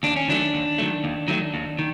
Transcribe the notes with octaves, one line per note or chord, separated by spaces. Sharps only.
D#2 D4
C#4
D#3 F#3 A3 D4
D#2
D#3 F#3 A3
D#2
D#3 F#3 A3
D#2
D#3